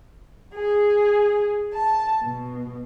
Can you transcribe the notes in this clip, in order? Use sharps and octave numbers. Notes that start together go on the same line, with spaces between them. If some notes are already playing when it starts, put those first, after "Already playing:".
G#4
A5
B2